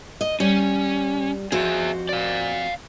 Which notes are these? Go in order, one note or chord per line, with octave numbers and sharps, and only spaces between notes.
D#5
G3 C#4
F2 F#4 G#4 C5 E5
D5 F5